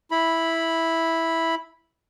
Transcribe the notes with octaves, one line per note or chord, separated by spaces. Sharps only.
E4 B5